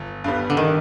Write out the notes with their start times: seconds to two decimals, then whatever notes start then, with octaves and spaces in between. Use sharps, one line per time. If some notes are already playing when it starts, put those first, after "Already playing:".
Already playing: G1
0.24 G2 D3 G3 B3
0.50 D3
0.57 D#3